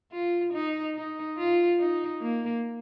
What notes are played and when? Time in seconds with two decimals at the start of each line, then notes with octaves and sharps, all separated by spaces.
0.12 F4
0.54 D#4
0.95 D#4
1.38 F4
1.79 D#4
2.21 A#3